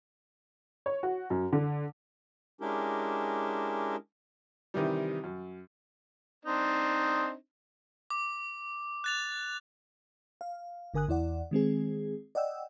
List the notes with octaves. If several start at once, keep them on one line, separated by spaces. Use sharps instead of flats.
C#5
F#4
F#2
D3
G#3 C#4 D4 E4 G4 A#4
C3 D#3 E3 G3
F#2
C4 D4 D#4
D6
F#6 A6 F7
F5
G1 D3 A#4 G#5 D#6 F#6
E2 E4 D5 F#5
D#3 G#3 C4 G#4
D5 D#5 F#5 G5 E6